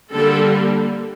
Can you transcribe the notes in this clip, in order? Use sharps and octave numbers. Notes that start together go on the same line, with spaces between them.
D3 G3 A#3 A4